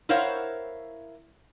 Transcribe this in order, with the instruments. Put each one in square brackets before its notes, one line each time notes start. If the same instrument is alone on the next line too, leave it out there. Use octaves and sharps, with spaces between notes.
[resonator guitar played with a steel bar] E4 A#4 C5 C#5 F5 F#5